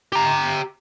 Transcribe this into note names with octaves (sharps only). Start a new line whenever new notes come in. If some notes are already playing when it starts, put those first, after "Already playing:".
G4 A#5